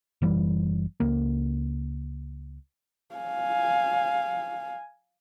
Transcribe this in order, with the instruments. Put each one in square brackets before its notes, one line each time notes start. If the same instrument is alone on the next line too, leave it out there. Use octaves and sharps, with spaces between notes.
[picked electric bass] F#1 E3 G3
C#2 A#3
[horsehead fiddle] F5 G#5